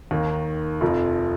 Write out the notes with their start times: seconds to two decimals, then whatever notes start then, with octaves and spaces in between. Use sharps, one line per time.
0.11 D#2 D#3 A#3
0.81 F1 F2 F3